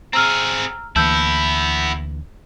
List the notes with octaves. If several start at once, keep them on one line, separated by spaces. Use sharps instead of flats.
C4 G#4 A#5 E6 F6
D2 E3 A#3 B3 E4 A5 E6 G6